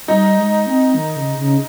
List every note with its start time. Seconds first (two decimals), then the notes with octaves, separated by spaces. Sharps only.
0.08 G3 D#4
0.38 G#3
0.67 C4
0.94 D#3
1.16 C#3
1.38 C#3